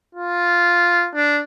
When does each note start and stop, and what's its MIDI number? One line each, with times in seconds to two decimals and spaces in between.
0.15 1.09 65
1.15 1.41 62